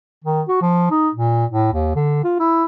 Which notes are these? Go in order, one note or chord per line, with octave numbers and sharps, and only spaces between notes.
D#3
F#4
F3
D#4
A#2
A2
D#2
D3
F4
E4